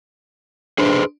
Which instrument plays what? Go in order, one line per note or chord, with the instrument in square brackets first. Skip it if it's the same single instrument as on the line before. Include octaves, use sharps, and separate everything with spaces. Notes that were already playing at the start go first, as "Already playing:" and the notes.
[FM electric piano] D4 [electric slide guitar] G#4 B4 C5